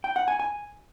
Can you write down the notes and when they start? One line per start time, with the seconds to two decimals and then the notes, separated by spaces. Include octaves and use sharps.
0.04 G5
0.16 F#5
0.28 G#5
0.40 G#5